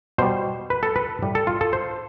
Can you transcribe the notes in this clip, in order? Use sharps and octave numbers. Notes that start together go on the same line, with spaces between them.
B2 G3 C5
B4
A4
B4
A2 G3
A4
F4
A4
C5